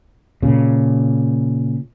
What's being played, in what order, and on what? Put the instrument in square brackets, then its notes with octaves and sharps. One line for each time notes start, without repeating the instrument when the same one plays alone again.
[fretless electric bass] A#2 C#3